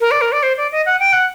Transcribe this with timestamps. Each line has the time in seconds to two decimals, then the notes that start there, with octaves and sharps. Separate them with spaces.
0.01 A#4
0.11 D5
0.21 A#4
0.32 D5
0.43 C5
0.57 D5
0.72 D#5
0.86 F#5
1.00 G5
1.13 F#5